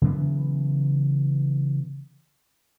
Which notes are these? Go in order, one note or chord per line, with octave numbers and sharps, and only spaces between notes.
C#3 E3 F#3 B3